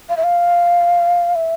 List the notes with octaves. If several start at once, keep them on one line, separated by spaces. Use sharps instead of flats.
F5
E5
F5
E5